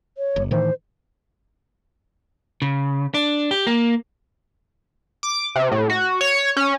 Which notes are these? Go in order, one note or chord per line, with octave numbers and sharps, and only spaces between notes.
C#5
F#1
A2 D#3 E3 C5
C#3
D4
G4
A#3
D6
C3
A2
F#4
C#5
C#4